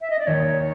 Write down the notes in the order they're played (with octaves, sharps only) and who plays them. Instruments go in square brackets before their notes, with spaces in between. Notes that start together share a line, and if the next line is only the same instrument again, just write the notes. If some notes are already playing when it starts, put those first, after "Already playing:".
[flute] E5
D#5
D5
[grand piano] D#2 D#3 [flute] C#5